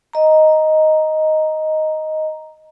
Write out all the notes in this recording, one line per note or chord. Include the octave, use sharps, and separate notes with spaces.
D#5 A#5